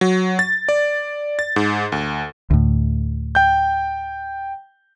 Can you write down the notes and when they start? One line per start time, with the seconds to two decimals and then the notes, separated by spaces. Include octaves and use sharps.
0.01 F#3
0.39 A6
0.69 D5
1.39 A6
1.56 G#2
1.92 D2
2.50 D2 A2
3.35 G5 G6